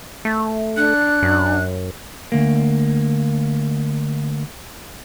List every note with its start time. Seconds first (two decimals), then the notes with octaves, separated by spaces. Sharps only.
0.25 A3
0.77 D4 F#6
1.22 F#2
2.32 D2 A#3